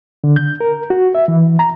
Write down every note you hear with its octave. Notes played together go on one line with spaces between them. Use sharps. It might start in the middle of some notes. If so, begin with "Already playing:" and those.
D3
G6
A#4
F#4
E5
E3
A#5